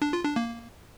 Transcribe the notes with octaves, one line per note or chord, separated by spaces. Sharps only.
D4
F4
D4
A#3